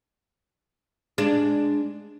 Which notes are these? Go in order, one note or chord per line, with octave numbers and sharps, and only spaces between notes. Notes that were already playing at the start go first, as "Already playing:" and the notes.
G#3 D4